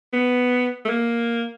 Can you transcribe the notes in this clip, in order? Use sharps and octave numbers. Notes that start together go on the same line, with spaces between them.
B3
A3
A#3